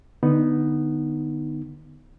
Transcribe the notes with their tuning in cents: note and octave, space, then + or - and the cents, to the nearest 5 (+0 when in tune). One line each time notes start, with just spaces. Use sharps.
D3 +15 B3 +0 D#4 +0